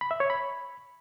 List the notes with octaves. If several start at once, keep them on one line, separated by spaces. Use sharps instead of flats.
B5
E5
C#5
B5